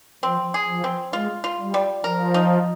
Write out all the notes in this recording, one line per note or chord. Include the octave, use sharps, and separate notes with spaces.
F3 C4
G#4
F3
C4
G#3 F4
F4
G3
G3
F3 A#4
D#4